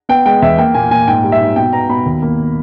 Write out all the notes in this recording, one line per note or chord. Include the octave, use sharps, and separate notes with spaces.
B3 G5
G#3 G5
E2 E5
A#3 G5
A#2 G#5
A#2 G#5
G#2 G5
G3
E5
G#2
B2 G5
B3 A#5
B2 B5
D#2
A#3